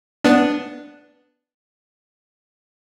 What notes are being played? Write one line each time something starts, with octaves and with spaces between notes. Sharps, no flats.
B3 D4